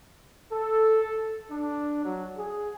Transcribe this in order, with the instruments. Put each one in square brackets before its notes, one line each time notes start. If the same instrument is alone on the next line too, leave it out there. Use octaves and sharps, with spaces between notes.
[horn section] A4
D4
F#3
G#4